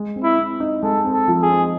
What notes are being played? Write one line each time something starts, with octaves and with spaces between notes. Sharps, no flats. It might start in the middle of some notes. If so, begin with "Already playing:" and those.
Already playing: G#3
C4
E4
C4
D#4
G#3 A4
C4
A4
F3
G#4
C4